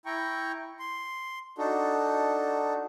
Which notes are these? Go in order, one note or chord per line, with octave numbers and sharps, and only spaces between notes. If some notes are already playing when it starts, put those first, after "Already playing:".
E4 G5 A#5 C#6
C6
D4 D#4 F#4 A4